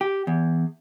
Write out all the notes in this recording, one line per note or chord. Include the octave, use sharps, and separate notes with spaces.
G4
E2